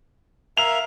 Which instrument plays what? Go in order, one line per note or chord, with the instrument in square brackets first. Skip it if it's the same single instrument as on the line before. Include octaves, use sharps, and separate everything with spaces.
[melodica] A#4 E5 F5 [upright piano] F7